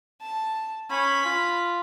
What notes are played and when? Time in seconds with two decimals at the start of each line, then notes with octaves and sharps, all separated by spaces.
0.21 A5
0.91 C#4 B5
1.25 F4